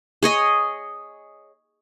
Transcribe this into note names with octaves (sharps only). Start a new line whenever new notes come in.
G#4 C#5 D#5